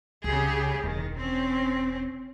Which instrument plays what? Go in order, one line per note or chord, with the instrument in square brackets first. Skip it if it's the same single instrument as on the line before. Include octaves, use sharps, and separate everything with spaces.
[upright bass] C#2 [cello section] C#3 G4 G#4
[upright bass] E1 [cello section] D#3
[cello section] C4 C#4